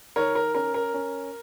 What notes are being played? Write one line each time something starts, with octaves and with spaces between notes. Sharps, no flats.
D#3 A#4 C#5
A#4
C#4 A#4
A#4
C#4